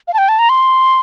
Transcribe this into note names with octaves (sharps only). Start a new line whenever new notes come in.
F5
A5
G5
A5
A#5
C6